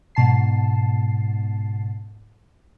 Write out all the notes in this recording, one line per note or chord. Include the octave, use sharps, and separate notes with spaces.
G#2 B2 A5 C7